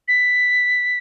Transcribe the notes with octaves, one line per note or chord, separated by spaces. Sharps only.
B6